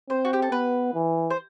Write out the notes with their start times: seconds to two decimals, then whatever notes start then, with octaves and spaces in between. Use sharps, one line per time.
0.10 C4 C5
0.25 F#4
0.33 G4
0.42 A4
0.52 B3 B4
0.94 E3
1.30 C5